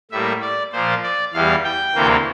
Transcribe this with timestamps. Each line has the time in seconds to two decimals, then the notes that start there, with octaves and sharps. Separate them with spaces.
0.11 A2 G3 A#3 E5
0.42 D5
0.72 A#2 F3 A#3 C5
1.03 D5
1.34 E2 E3 G3 F5
1.65 G5
1.95 D2 C3 E3 A#3